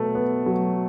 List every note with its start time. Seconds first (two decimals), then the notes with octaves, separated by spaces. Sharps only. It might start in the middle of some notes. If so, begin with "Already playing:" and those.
Already playing: B2 F#3 A3 B3 A4
0.15 B3
0.46 F#3